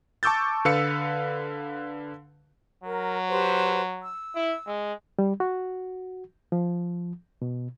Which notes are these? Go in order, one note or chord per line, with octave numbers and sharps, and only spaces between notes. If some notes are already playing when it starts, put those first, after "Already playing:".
A5 C#6 D6 E6 G6 A6
D3 B4 F5 E6 C#7
F#3 A#4
G4 B4 C5
E6
E4
G#3
G3
F#4
F3
B2